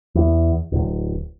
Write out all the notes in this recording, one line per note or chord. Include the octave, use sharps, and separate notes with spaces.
E2
D1